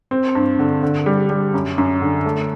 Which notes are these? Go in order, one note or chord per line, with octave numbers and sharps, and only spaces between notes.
C4
G2
D3
D3
G3
G3
F#2
F#2
D3
A3